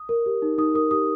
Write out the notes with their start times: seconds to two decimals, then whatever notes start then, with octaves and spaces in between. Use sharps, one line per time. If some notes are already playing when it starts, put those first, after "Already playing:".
Already playing: D#6
0.09 A#4
0.26 G4
0.42 D#4
0.58 D#4 D#6
0.74 A#4 D#6
0.91 G4 D#6